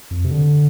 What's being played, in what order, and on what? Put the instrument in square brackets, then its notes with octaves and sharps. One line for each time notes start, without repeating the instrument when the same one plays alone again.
[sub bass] F2
C3
D3